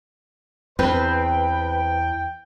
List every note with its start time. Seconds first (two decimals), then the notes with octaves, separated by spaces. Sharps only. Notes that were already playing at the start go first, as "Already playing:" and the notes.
0.79 E2 C4 B4 C5
1.11 G5